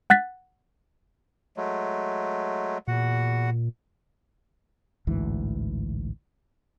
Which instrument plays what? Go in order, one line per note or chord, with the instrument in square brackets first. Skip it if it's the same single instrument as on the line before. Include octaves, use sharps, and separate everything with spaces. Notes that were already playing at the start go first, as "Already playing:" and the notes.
[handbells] F#5 F#6 A6 B6
[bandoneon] F#3 G#3 A3
[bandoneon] E2 F#4 F#5 [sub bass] A#2
[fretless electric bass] A1 D2 G#2 E3